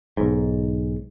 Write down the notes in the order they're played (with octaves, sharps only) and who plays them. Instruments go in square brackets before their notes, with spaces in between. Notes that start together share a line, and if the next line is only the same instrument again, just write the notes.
[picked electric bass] B1 G#2